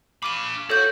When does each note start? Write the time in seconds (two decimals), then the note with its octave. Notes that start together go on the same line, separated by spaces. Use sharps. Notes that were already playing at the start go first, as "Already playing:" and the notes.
0.23 F5 B5 D6 D#7
0.70 F#4 A4 C#5 G6